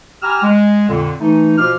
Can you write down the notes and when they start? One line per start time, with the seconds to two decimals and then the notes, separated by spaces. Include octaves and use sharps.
0.22 G4 G#5 A#5 B5 E6 F6
0.43 G#3
0.89 F2 A#2 D3
1.21 E3 A3 D#4
1.57 B2 F3 F4 D6 F6